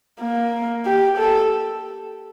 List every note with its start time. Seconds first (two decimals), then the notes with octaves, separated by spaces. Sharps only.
0.21 A#3
0.86 G4
1.18 A4